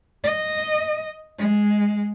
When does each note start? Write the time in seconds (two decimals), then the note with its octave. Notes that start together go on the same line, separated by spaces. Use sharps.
0.24 D#5
1.39 G#3